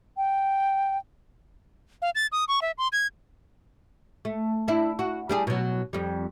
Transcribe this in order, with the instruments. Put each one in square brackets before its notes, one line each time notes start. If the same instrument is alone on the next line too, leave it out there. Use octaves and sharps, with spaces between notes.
[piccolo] G5
[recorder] F5
A6
D#6
C#6
E5
C6
G#6
[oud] A3
D4 E4
F#4
G3 D4 G#4
B2 F#3
F2 G3